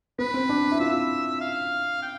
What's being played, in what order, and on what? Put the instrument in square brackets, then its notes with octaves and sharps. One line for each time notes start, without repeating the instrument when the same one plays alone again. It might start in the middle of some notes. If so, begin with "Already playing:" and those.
[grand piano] B3 [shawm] B4
[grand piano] C4
D4
E4
[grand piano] F4 [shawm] E5
[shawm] F5
G5